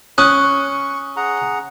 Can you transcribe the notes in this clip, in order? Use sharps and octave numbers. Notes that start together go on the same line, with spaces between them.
C#4 C#6 D#6 F#6
G#4 F#5 A#5